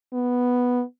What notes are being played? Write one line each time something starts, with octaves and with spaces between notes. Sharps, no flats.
B3